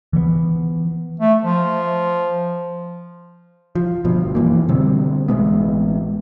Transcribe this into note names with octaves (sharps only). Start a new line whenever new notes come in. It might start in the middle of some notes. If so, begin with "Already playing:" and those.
E3 F3 G#3 B3
A3
F3
F3
G1 B2 F3
F#2 E3 A#3
B2 D3 G3 C4
A1 G#3 B3